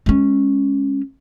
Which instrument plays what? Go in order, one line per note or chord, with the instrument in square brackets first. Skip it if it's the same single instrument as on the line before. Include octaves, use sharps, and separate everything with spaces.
[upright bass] G#3 C#4